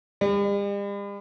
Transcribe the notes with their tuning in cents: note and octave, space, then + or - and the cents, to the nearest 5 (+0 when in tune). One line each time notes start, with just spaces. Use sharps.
G3 +45